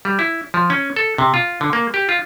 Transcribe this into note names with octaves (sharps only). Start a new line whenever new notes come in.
G3
E4
F3
C#4
A4
C3
F4
D3
A#3
G4
F4